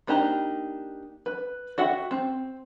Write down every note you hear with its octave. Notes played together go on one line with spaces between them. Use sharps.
A#3 D4 D#4 G4 A#5
B4
F#4 E5 F#5 G5
C4